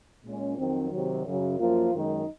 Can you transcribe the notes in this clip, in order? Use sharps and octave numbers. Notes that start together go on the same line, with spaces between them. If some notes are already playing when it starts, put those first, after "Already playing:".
A#2 G#3 C#4
F2 D#3 F#3 C4
C3 D#3 F#3
F#2 C#3 F#3
F#2 F3 A#3 F4
F#2 D#3 G#3 D#4